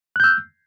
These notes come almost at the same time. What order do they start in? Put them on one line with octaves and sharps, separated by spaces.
F#6 G6 E6